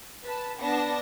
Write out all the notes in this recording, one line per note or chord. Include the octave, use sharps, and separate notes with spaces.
B4 A5
B3 D4 A5 A#6